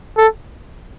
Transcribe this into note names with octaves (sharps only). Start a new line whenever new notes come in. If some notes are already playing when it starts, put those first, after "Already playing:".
A4